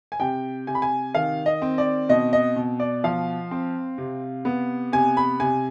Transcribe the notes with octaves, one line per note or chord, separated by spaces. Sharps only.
G#5
C3 G5
C3 G#5
B5
G#5
D#3 F5
D#5
C4
D5
B2 D#5
D#5
B2
D5
F3 F5
C4
C3
B3
C3 G#5
B5
C3 G#5